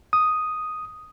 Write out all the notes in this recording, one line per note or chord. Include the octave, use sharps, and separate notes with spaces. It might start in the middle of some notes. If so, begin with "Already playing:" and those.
D#6